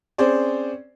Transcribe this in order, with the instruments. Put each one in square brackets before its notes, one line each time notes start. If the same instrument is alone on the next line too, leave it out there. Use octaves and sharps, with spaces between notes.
[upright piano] C4 C#4 G#4 C5 D5